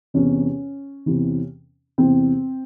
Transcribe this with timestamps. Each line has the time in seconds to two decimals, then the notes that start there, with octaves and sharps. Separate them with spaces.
0.14 E2 C3 E3 C#4
1.06 E2 C3 E3
1.98 E2 C3 E3 C4